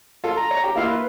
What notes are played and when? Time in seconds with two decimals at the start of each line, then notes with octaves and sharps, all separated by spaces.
0.24 F4 A4
0.37 A#5
0.51 C#5
0.64 G4
0.76 A#3 E4 F4 F5
0.87 B4